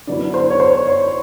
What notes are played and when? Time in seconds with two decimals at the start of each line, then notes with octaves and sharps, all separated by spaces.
0.07 D3 F#3 B3 E4 D5
0.34 C5
0.50 C#5
0.60 C5
0.87 C#5